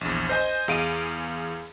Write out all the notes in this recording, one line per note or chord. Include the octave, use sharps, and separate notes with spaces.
A#1 E2
C5 D#5 G#5
E2 G#4 F5 D7 D#7